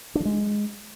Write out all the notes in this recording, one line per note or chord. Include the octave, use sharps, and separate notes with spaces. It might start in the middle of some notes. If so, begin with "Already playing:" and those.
D4
F3
G#3